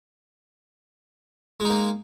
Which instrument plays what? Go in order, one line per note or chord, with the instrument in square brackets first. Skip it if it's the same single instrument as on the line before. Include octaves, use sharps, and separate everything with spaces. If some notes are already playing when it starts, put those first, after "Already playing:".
[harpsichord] G#3
D#4
A#3